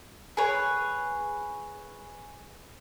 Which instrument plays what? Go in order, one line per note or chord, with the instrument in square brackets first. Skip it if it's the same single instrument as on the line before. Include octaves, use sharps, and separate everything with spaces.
[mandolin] G#4 B4 C#5